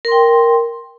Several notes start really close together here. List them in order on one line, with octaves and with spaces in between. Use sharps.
A#4 C6 G5